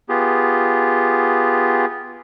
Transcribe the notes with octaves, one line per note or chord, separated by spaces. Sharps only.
B3 F4 G4 G#4